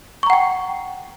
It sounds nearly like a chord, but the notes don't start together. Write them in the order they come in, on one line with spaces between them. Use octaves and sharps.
C#6 A#5 F#5 G5